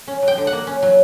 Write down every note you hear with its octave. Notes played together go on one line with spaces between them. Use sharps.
C#4
F#3
G5
D3
F#5
A#3
C#4
F#3